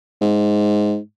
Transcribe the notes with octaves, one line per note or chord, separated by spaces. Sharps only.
G#2